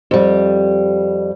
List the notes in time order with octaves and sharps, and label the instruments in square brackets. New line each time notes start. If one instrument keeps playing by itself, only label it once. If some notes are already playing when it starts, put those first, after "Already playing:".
[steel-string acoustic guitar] F2 G3